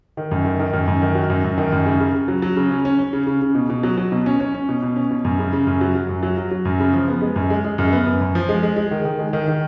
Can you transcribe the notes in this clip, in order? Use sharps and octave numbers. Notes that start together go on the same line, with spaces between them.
D#3
F#2
D#3
D#3
F#2
F#2
D#3
F#3
F#2
F#2
D#3
F#2
C#3
C#3
C#3
F#3
F#3
C#3
C#4
C#4
C#4
C#3
C#3
C#3
B2
B2
F#3
F#3
B2
C#4
C#4
C#4
B2
B2
C#4
B2
F#2
C#3
C#3
F#2
F#3
F#3
F#2
F#3
F#3
F#3
F#2
C#3
F3
B3
G#3
F#2
G#3
G#3
F#2
B3
F#2
F#2
F3
G#3
G#3
G#3
D#3
D#3
G#3
D#3
D#3